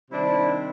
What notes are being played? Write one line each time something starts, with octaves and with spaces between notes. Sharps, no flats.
C3 D#3 G3 C4 D4 E4